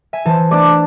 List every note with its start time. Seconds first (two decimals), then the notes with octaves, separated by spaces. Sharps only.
0.13 E5 G#5
0.25 E3 C5 A5
0.51 A3 D4 D5